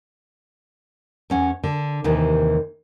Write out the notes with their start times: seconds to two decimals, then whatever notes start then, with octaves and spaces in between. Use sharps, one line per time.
1.30 E2 C#4 F#5
1.64 D3
2.04 D#2 C3 D#3 E3